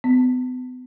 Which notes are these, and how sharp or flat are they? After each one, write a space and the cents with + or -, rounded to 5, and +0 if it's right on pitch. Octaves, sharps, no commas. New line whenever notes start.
B3 +40